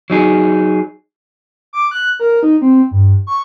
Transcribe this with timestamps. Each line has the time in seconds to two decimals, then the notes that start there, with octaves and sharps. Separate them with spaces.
0.10 F#3 D#4 G#4
1.73 D6
1.91 F#6
2.20 A#4
2.43 D#4
2.61 C4
2.91 G2
3.27 C#6